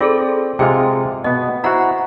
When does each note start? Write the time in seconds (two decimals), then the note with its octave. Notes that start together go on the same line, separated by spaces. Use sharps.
0.01 C4 F4 G#4 A4 D5
0.59 C3 G#3 F4 G#4 G5
1.24 B2 B3 D#5
1.64 E4 F#4 C5 F#5 A#5